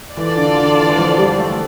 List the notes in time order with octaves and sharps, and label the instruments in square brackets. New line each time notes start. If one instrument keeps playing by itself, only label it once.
[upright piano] E3 [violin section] F4 A4 D5
[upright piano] D3
D3
E3
E3
F3
G3
A3